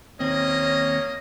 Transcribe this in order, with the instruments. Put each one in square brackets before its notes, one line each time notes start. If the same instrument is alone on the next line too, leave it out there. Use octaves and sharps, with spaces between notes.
[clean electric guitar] D#2 C4 [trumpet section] A#3 C#4 D#5 [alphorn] C#5